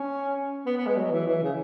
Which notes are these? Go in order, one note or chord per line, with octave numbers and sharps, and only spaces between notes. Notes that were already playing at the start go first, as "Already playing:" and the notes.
Already playing: C#4
B3
B3
G#3
F#3
E3
E3
C#3